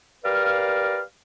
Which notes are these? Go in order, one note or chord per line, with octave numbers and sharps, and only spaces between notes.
G4 A#4 B4 D5 F5